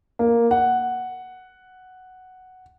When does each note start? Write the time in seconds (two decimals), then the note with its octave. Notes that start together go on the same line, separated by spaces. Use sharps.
0.19 A#3
0.51 F#5